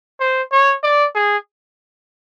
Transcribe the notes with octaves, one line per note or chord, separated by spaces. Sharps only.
C5
C#5
D5
G#4